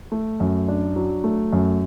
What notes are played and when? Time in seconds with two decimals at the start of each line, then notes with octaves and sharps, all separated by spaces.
0.12 A3
0.40 F#2
0.68 D4
0.96 F#3
1.24 A3
1.53 F#2